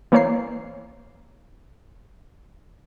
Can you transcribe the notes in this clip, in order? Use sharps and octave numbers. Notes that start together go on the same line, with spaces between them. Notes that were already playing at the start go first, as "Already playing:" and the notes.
E3 A#3 C5 C#5 A#5 C7